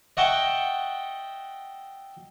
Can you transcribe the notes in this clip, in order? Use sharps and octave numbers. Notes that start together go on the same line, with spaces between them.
D#5 E5 F#5 G5 A5 C#6